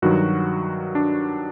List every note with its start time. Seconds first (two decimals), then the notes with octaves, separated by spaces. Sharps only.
0.02 G2 D#3 F#3 F#4
0.95 D4